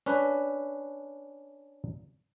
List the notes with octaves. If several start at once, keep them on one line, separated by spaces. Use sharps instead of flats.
C#4 D4 B4